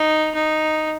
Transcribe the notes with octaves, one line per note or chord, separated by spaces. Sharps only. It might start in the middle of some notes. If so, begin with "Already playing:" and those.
Already playing: D#4
D#4